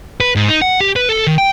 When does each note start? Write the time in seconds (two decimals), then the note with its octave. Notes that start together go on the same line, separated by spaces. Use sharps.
0.21 B4
0.36 G#2
0.49 D#4
0.62 F#5
0.81 G4
0.96 B4
1.09 A4
1.27 D#3
1.38 G5